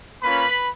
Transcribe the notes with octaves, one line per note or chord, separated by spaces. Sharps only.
A#3 C#4 F4 B4 B5